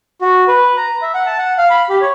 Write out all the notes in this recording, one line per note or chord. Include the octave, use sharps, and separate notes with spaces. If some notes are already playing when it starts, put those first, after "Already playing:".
F#4
B4
A#5
E5
F#5
A5
F#5
F5
B5
G4
C#5